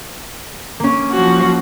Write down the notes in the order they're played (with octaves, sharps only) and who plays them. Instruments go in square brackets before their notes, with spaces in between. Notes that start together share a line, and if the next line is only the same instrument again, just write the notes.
[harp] A#3 C#4
[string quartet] F3 F#4